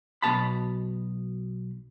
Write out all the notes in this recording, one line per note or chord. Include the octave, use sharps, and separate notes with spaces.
B1 B2 A5 B5